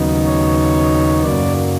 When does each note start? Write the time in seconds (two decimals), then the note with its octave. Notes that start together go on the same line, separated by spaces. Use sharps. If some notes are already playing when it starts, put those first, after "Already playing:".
Already playing: D#2 C#3 F#3 B3 D#4
0.26 C#5
0.57 C#5
1.23 F#2 C#3 F#3 A#3 D5